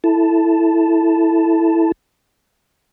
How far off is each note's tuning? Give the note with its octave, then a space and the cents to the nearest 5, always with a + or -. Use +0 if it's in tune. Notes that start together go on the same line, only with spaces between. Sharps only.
E4 +0 A4 +0 A5 +0